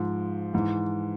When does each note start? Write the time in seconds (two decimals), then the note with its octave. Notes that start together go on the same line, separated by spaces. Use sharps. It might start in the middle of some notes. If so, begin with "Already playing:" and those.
Already playing: G#2 F3
0.53 G#2 E3